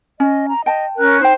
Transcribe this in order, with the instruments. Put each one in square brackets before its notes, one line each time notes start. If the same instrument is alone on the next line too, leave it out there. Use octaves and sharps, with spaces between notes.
[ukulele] C#4 [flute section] D#5
[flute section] A#5
[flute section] D#5 [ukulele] G5 A5
[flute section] C#4 A#4 F#6
[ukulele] D#4 G5 [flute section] C5